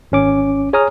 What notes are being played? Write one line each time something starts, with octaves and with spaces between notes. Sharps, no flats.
G#1 C#4 D6
G#4 C#5 G#5 A#5 D#6 F6